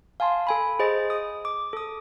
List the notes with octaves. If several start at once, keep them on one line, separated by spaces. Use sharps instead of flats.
F5 G#5 A5 C6
A4 G#5 B5
G#4 C5 D#5 A6
D#6
D6
A4 D#6